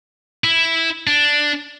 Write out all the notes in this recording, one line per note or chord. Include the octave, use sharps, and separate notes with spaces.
E4
D4